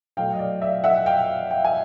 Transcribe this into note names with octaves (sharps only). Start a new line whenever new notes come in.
B2 F#3 A3 F5 G5
D#5
D5
D5 E5
E5 F#5
F5 G5
G5
G#5